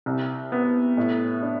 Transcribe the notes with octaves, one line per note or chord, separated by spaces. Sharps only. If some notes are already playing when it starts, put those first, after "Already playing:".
C2
B3
A2
D4